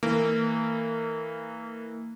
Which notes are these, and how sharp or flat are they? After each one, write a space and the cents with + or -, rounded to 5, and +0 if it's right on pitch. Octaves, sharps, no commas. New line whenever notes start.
E3 -25 A#3 -30